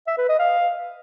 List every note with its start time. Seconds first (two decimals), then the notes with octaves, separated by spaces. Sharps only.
0.07 E5
0.18 B4
0.29 D#5
0.40 F5